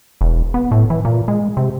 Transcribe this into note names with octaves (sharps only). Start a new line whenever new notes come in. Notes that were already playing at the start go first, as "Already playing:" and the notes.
E1
B3
A2
E3
A#2
G#3
C3